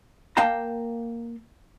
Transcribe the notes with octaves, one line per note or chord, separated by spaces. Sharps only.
A#3 F5 G5 A5 A#5